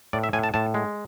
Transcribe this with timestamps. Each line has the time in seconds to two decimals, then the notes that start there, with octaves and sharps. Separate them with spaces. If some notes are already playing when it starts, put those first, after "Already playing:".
0.13 A2 D5
0.24 E5
0.33 A2 G#5
0.44 A5
0.54 A2 A5
0.74 G#3